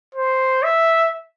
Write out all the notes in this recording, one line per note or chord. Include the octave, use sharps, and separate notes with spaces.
C5
E5